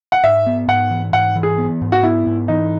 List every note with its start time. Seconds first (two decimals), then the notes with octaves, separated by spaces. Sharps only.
0.12 F#5
0.24 G#2 E5
0.46 B3
0.68 G#2 F#5
0.91 E3
1.13 G#2 F#5
1.35 E3
1.43 G#4
1.58 B3
1.82 G#2
1.92 F#4
2.03 B3 E4
2.27 G#2
2.48 E3 D#4